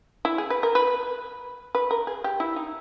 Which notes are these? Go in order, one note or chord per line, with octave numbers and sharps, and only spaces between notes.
E4
G#4
B4
A#4
B4
B4
A#4
G#4
G4
E4
D#4